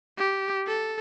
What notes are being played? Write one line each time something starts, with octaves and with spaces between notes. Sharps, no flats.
G4
A4